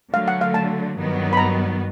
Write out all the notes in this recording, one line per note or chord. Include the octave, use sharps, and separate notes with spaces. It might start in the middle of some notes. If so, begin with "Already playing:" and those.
D3 F#3 A3 F5
F#5
F5
A5
G2 D#3 F#3 B3
B5
A#5